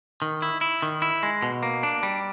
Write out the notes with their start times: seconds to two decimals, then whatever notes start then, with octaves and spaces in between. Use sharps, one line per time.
0.22 D#3
0.42 E4
0.61 E4
0.82 D#3
1.02 E4
1.23 G#3
1.43 B2
1.63 A#3
1.83 D4
2.03 G3